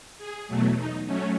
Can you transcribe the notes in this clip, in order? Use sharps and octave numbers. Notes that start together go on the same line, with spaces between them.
G#4
E2 B2 F#3 A3
D#4
F#3 A3 C#4